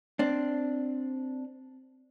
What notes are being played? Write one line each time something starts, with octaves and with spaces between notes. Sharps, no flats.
C4 D4